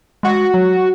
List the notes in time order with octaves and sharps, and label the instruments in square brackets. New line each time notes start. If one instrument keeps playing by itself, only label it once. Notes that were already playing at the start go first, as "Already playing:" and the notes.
[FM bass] G#3 [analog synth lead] F#4
[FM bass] F#3